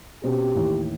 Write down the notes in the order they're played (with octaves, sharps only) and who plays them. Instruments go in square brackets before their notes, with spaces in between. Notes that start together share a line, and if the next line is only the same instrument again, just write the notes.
[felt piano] B2 C4 C#4 [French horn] G4
[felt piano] A1 D#2 A2